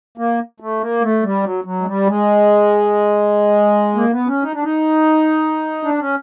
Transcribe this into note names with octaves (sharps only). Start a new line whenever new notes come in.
A#3
A3
A#3
A3
G3
F#3
F#3
G#3
G3
G#3
A#3
B3
C#4
D#4
D4
D#4
D4
C#4